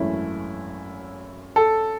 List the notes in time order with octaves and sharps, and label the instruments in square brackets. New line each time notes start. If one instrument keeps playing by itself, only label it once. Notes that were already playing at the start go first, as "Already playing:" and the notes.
Already playing: [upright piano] G#1 F#2 E3 A3 C#4 [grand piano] E4
[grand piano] A4